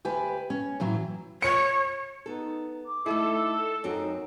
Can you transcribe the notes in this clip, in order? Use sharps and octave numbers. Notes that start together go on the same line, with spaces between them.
D2 G4 B4 G#5
C#4
A2 E3 F#3
C#5 C#7
B3 D#4 A4
D6
A3 D#4 E4 A4
F#2 C4 D#4 F#4